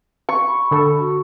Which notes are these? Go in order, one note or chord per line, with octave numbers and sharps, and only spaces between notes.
C#6
B5
D3 A4
F#4